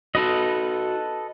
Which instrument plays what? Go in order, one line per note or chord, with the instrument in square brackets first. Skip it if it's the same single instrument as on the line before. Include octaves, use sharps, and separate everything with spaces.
[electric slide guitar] D#4 F#4 [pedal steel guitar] A4 B4 D#5